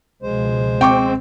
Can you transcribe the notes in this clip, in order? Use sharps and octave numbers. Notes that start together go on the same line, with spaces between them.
C#2 B2 F3 G#3 C5
C4 G5 C#6 D6